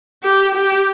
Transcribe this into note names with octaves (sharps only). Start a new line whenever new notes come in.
G4
G4